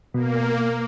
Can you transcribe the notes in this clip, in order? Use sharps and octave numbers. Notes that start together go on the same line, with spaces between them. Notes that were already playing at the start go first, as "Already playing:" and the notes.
B2 A#3